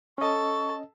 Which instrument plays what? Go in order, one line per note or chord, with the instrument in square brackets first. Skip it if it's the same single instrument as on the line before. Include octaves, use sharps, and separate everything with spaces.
[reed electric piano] C#4 D#5 [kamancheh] A4 A5 [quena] C#6